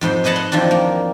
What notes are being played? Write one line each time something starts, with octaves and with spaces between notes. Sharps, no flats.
F2 G#2 C5 C6
G#4 B4 D#5 F#5 A5
C6
E2 D#3 F3 C4 D4
A#3